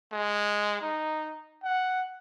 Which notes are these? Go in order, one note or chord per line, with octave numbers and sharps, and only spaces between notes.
G#3
D#4
F#5